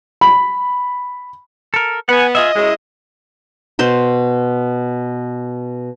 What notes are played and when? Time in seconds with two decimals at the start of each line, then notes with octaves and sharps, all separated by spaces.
0.21 B5
1.74 A4 A#4
2.09 B3 F#5 G#5
2.35 F4 G#4 D#5 E5
2.56 F#2 F#3 G#3 E4
3.79 B2 C5 C6